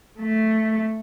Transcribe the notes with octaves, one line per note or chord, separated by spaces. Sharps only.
A3